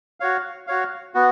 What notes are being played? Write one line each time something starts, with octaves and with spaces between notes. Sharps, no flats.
F#4 C#5 F5
F#4 C#5 F5
B3 F#4